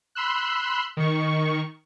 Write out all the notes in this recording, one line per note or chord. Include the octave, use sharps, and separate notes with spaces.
B5 C6 E6 F#6
D#3 C#6